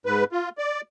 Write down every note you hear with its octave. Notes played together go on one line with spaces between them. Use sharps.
G#2 B4
F4
D5